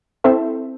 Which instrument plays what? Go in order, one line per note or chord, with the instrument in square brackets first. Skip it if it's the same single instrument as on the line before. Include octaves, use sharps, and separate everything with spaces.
[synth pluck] C4 E4 A4 C5 E5